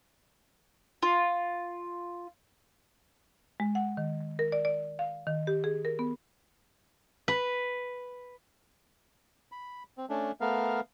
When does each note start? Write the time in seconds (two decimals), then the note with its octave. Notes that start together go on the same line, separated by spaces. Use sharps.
1.02 F4
3.60 G#3
3.75 F#5
3.97 D#3
4.39 A#4
4.52 D5
4.65 D5
4.99 F5
5.27 D#3
5.47 G4
5.64 G#4
5.85 A#4
5.99 B3
7.28 B4
9.52 B5
9.98 C4
10.10 A3 C#4 D4
10.41 A3 B3 A#4 F5